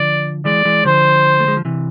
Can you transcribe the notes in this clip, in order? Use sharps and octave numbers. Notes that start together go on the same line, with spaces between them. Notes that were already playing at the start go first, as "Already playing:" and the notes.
Already playing: D3 F3 D5
E3 G#3 D5
E3 G#3
D3 F3 C5
A3
G#3
F3
C3 E3